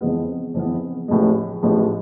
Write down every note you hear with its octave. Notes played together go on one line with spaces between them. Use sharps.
F2 E3 G#3 B3
F2 E3 G#3 B3
A1 A2 F3 G#3
A1 A2 F3 G#3